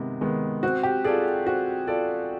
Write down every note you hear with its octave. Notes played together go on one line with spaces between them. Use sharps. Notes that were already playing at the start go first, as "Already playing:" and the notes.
Already playing: C3 D#3 G#3 B3
D#3 G#3 B3
C4 F#4
G4
F4 G#4 A4 D5
C4 F#4
F4 A4 D5